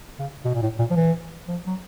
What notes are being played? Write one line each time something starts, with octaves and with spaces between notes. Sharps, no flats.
C#3
B2
A#2
A2
A#2
F3
E3
F3
F#3